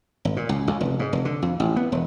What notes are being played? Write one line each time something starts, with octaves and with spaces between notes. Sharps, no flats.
G#1
A#2
C#2
C#2
F1
G#2
F1
D3
F2
A1
B3
E1